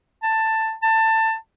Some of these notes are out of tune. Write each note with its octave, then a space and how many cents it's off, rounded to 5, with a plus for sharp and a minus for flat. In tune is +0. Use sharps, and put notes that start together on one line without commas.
A5 +10
A5 +20